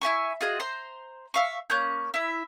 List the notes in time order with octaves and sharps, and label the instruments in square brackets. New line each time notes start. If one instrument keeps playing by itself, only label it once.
[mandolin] E4 E5 G#5 C#6
F4 F#4 G#4 D#5
C5 A#5 C6
E5 F5 C#6
A#3 C#4 F#6 G6
E4 E5